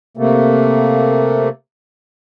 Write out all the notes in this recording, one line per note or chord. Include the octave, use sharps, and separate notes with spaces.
C3 A3 A#3